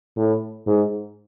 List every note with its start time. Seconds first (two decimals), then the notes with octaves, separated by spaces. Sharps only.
0.17 A2
0.67 G#2